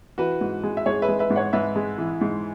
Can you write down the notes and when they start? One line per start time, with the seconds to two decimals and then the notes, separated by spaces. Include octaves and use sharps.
0.18 E3 F#4 B4
0.41 G#2
0.63 G#3
0.77 E5
0.86 G#2 G#4 C#5
1.02 B4 E5
1.08 G#3
1.19 B4 E5
1.30 G#2
1.36 C#5 F#5
1.53 G#2 B4 E5
1.76 G#3
1.98 E3
2.21 G#2